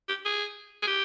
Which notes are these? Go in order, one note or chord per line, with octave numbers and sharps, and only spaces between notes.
G4
G#4
G#4
G4